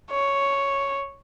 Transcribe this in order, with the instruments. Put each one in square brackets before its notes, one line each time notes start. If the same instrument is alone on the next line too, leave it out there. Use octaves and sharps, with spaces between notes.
[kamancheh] C#5